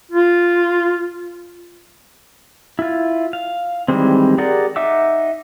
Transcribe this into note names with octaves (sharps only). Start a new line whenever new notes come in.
F4
E4 F4
F5
D#3 E3 G3 G#3 C4
G4 G#4 A#4 D5 F#5
D#4 E5 F#5 D6 E6